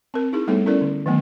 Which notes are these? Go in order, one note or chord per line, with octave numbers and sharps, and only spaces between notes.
C4 A#4
D#4 E4 G#4
G3 A3 B3 D#4 A4 C#5
C#4 E4 A4 A#4 D5
D3
D#3 F#3 A3 B3